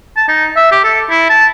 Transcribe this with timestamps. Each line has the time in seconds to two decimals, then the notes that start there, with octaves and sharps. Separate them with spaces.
0.17 A5
0.28 D#4
0.56 E5
0.72 G4
0.84 A4
1.10 E4
1.30 A5